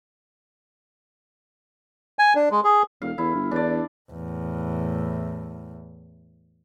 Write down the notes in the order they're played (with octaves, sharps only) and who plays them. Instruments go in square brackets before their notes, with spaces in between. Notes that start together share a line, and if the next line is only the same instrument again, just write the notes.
[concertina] G#5
D4
G#3
G#4
[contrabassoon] E1 [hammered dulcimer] F5
[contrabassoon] E2 [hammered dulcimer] E4
[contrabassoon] G1
[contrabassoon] E2 [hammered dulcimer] D4 D5
[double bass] E2 A2